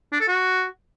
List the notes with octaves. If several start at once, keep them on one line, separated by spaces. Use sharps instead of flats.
D4
A4
F#4